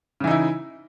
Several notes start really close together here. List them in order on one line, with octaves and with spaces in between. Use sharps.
C#3 E3 D#4 E4